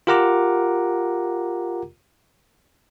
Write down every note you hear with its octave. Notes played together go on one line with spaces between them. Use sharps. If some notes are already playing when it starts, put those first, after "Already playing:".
F4 G4 A#4 F#5 A#5 D6